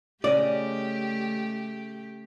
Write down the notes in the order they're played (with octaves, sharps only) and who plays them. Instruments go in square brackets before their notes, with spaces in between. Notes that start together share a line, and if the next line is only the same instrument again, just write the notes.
[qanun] C#3 D#5 [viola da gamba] A3 G4 [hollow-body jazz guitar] D5